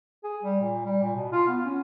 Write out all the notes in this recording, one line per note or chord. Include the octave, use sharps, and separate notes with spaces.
G#4
G3
A#2
G3
A#2
B2
F4
B3
C#4